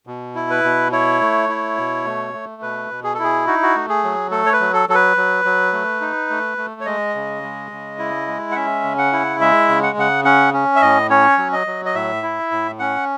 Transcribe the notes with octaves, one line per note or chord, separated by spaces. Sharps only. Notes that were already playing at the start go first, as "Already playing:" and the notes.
B2
E4
B4
B2
E4 C#5
A3
E4
B2
A3
A3
B2 B4
B2
G#4
A4
E4 G#4
D#4 F#4
F#4
A3
G#4
F#3
A3 A4
C#5
B4
F#3
A4
F#3 A4
B4
F#3
F#3
A3
D#4
A3
A3
C#5
G#3 D#5
C#3
G#3
C#3
E4
G#3
F#5
C#4 E5
C#3
F#5
E4
G#3 E5
C#3
F#5
C#3 F#5
C#4 F#5
C#4
E5
A2 D#5
C#4 C#5
F#3
D#5
F#3
D#5
A2 E5
E4
A2
C#4 F#5